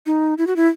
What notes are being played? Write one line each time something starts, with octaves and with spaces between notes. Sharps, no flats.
D#4
E4
F#4
E4